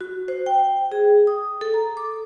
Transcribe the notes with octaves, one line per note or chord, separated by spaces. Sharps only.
F#4
C5
G5
G#4
D#6
A4
A#5
D6